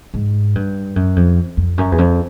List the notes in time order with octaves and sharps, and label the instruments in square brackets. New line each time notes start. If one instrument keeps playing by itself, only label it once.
[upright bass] G#2
G2
F#2
F2
F2
F#2
E2
F2